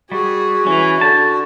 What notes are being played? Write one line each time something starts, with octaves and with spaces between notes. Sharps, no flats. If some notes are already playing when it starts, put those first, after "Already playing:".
G3 F#4 G#4
E3 C#4
D3 A5